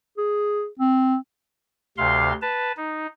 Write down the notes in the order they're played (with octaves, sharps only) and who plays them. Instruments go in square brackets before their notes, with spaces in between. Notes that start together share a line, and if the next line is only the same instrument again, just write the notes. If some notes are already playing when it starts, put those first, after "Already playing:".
[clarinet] G#4
C4
[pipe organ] D2 C3 F5 C6
B4 A5
D#4